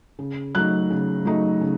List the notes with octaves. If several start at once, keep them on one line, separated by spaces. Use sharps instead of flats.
C#3
F#3 A3 D#4 F#6
C#3
F#3 A3 D#4
C#3